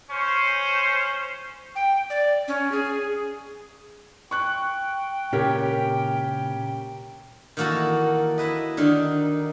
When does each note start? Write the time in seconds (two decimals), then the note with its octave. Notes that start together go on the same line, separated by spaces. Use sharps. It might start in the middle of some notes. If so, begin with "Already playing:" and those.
0.11 C#4 C5
1.76 G5
2.10 D5
2.48 C#4
2.72 G#4
4.31 G5 C#6 F#6
5.33 A#2 C#3 C#4 G4 A#4
7.57 D#3 E3 A#3 F#4 A4 A#4
8.38 E4 B4 D#5
8.77 D3 D#3 D#4